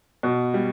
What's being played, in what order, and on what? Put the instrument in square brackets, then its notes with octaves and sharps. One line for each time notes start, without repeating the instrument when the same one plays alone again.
[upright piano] B2
G3